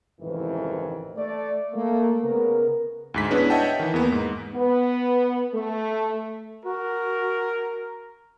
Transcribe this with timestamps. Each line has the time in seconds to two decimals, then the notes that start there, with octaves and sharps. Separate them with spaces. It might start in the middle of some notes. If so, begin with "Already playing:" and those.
0.20 A1 F2 G#2 C3 D#3 E3
1.16 A3 D5
1.74 A3 A#3
2.23 C#3 B3 A#4
3.14 D2 G#2 B6
3.31 B3 C#4 D4 E4 G#4 B4
3.50 C#5 D#5 E5 F#5 G5 A5
3.79 D#3 E3
3.94 E2 A#3 B3
4.12 G#2
4.54 B3
5.54 A3
6.65 F#4 A#4